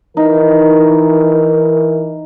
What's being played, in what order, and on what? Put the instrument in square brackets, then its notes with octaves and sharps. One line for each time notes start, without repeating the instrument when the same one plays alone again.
[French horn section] E3 A#4 [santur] D#4